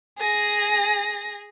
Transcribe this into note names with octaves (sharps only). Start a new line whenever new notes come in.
G#4 A#6